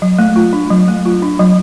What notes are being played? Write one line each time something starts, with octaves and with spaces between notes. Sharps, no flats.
F#3
A3
F4
D4
F#3
A3
F4
D4
F#3